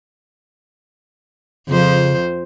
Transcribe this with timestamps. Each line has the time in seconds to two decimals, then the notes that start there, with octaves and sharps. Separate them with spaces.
1.68 F2 C#3 F3 C5